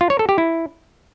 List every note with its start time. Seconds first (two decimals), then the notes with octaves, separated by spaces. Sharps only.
0.01 F4
0.10 C#5
0.19 A4
0.29 G4
0.38 E4